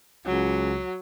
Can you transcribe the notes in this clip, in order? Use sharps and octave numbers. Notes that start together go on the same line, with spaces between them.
C#2 F#3